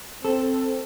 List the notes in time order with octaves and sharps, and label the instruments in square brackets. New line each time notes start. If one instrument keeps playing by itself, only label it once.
[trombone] C4 [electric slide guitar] A4